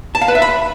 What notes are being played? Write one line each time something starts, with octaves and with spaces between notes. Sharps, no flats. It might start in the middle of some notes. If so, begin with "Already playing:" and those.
A5
F5
B4
E5
B5